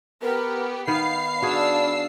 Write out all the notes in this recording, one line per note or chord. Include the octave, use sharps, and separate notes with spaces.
B3 G4 A#4
D#3 B3 F5 B5 C7
D4 F#4 G#4 E6